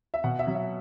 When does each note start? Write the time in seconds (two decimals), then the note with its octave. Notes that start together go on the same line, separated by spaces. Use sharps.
0.14 E5
0.24 B2 F#5
0.39 E5
0.47 F#3
0.55 E5